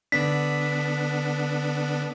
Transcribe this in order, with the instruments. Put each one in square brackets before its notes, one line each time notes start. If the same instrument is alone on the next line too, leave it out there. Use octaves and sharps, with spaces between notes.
[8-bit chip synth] D3 B3 D4 [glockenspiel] B6